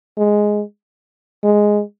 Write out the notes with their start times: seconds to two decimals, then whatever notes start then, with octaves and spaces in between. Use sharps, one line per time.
0.18 G#3
1.43 G#3